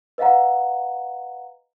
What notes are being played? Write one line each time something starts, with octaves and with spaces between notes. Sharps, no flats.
B4 D#5 F5 F#5 A#5